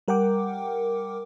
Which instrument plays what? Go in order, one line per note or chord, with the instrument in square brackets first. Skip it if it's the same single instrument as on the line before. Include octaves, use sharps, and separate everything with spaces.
[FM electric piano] G3 A#4 F#5 G5 D6